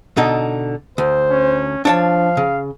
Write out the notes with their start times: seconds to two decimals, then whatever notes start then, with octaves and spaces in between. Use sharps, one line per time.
0.17 B2 D3 D#4
0.98 D2 C5
1.30 C#4
1.85 F3 D4 C#5 F5 A5
2.37 C#3